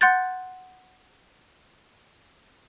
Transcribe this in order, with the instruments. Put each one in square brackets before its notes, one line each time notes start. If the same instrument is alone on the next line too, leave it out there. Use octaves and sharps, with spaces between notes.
[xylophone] F#5 C6 F#6 G6 A6